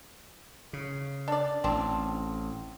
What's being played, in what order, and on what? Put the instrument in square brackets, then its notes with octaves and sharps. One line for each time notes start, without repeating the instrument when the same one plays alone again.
[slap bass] C#3
[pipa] D4 D5
[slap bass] A1 [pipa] C4 D4